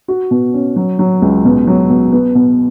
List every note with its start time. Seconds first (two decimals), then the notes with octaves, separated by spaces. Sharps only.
0.08 F#4
0.31 B2
0.54 C#4
0.76 F#3
0.99 F#3
1.22 C#2
1.45 B2
1.67 F#3
1.90 B2
2.12 B3
2.35 B2